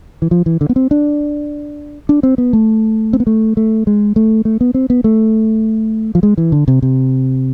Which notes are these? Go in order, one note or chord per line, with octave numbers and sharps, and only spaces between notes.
E3
F3
E3
D3
B3
C4
D4
D4
C4
B3
A3
C4
B3
A3
A3
G#3
A3
A3
B3
C4
B3
A3
F3
G#3
E3
D3
C3
C3